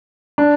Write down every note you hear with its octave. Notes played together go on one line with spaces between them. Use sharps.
D4